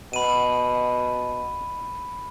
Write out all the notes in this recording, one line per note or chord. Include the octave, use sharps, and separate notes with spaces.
B2 B5 D#7